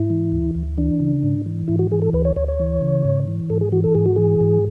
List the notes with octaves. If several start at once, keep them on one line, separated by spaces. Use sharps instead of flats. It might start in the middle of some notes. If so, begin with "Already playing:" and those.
Already playing: G#2 E4
E3
D2
D2
E3 D4
C#3
G#2
E3
G#2 E4
F#4
E3 G#4
A4
D2 B4
C#5
D2 C#5
C#5
E3
C#3
G#2
E3
G#2 A4
G#4
E3 F#4
A4
G#2 G#4
F#4
E3 G#4
G#2